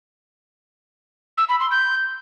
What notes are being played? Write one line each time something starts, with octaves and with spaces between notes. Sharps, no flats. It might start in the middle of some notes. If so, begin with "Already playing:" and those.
E6
B5
C6
G6